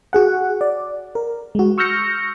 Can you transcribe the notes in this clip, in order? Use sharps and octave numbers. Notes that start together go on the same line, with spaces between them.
F#4 G#4 F#5
D5
A#4
G#3 F#4
C#6 E6 F6 G6 A#6 C#7